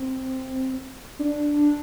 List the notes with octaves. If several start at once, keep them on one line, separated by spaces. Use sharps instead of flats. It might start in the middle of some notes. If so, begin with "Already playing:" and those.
Already playing: C4
D4